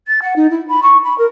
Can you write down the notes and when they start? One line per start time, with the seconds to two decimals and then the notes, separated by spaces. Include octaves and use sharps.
0.07 A6
0.22 F#5
0.36 D#4
0.50 E4
0.68 B5
0.82 C#6
1.03 B5
1.18 A#4